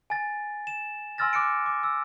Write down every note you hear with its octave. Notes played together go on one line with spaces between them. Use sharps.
G#5 A6
E7
G#5 C6 E6 F6 A6 A#6
D6 F#6 C#7 D7
D6
E6